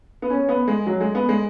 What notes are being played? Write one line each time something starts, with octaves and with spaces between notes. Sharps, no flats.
B3
C#4
B3
G#3
F#3
G#3
B3
G#3